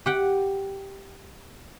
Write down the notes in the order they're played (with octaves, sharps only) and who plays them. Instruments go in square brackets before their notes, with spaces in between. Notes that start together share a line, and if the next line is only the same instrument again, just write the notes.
[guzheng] G4 F#5 G5